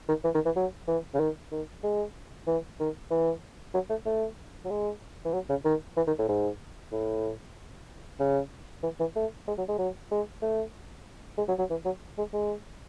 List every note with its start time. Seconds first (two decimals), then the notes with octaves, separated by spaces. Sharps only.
0.09 D#3
0.24 E3
0.35 D#3
0.45 E3
0.56 F#3
0.88 E3
1.14 C#3
1.20 D#3
1.52 D#3
1.83 G#3
2.47 E3
2.79 D#3
3.11 E3
3.74 F#3
3.90 A3
4.06 A3
4.65 F#3
4.70 G#3
5.25 E3
5.34 F#3
5.49 C#3
5.65 D#3
5.97 E3
6.07 D#3
6.19 A2
6.29 G#2
6.92 A2
8.19 C#3
8.83 E3
9.00 E3
9.16 A3
9.48 G#3
9.58 F#3
9.69 G#3
9.79 F#3
10.11 G#3
10.42 A3
11.38 G#3
11.49 F#3
11.59 F#3
11.70 E3
11.85 F#3
12.18 G#3
12.33 G#3